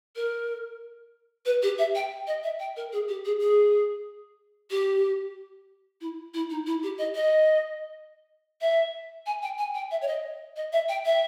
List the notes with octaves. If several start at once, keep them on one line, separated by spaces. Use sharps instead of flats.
A#4
B4
G4
E5
G5
D#5
E5
G5
A#4
G#4
G4
G#4
G#4
G4
E4
E4
D#4
E4
G4
D#5
D#5
E5
G#5
G5
G#5
G5
E5
C#5
D#5
D#5
E5
G5
E5